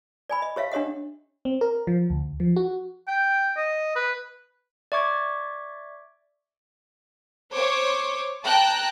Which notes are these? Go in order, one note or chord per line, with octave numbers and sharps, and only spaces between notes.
D5 G#5 B5
D#5
G4 C#5 E5 F5
D4 G4 C#5 D#5 F#5
C4
A#4
F3
D2
F3
F#4
G5
D#5
B4
D5 E5 C#6 D6 G#6
C5 C#5 D6
G5 A5 A#5 F#6